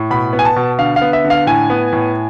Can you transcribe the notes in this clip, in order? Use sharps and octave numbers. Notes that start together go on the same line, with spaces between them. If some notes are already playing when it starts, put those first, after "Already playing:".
Already playing: A2
B2 B5
B3
G#5
A5
B2
D3 F5
F5
B3
E5
D3
F5
A2 G#5
B3
A2